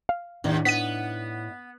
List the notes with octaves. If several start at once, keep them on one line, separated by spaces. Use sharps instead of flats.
F5
D#2 A2 D4 D#4
B3 B6 D#7